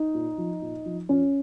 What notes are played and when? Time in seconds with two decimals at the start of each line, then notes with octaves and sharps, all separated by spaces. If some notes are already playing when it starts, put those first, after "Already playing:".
Already playing: D#4
0.14 A#2
0.38 F3
0.62 A#2
0.86 F3
1.09 F2 C#4